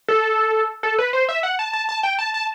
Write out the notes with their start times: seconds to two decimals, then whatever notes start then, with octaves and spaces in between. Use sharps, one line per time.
0.08 A4
0.83 A4
0.99 B4
1.13 C5
1.29 E5
1.43 F#5
1.59 A5
1.73 A5
1.89 A5
2.03 G5
2.19 A5
2.34 A5